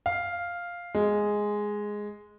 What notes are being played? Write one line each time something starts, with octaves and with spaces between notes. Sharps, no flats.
F5
G#3